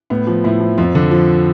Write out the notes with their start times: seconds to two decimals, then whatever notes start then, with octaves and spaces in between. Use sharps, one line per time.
0.10 A2 B3
0.27 F3
0.44 A2 E4
0.60 F3
0.78 F2 F4
0.95 D3
1.11 F3